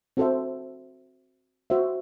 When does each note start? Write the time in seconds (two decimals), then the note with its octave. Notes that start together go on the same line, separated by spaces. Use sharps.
0.17 C4 F#4 A4 C5 E5
1.70 F#4 C5 E5